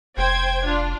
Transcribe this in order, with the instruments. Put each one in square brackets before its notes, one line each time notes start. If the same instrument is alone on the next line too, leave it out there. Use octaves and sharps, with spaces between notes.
[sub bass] F1 [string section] C5 G5 G#6
[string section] D4 F4